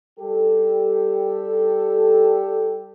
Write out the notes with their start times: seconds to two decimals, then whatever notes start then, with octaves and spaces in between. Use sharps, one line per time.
0.20 G3 G4 A4